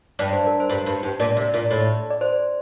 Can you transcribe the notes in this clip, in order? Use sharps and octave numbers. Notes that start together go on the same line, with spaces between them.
G2 D5
C5
A#4
C5
G2
G2
G2
A#2 D5
C3
A#2
A2
D5
C5